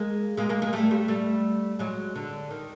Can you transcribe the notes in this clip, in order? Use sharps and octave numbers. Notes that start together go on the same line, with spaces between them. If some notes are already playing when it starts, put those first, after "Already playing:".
Already playing: G#3 A#3
G#3 A#3
G#3 A#3
G#3 A#3
G3 A3
G3 A3
G3 A3
F#3 G#3
D3
D#3